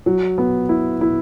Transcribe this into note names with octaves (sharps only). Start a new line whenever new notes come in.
F#3
B3
E4
E4